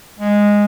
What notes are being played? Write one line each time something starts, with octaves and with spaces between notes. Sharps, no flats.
G#3